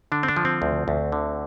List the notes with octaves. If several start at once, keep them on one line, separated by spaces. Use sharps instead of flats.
D3 D4
C4
D4
F3
C4
D2
D2
D3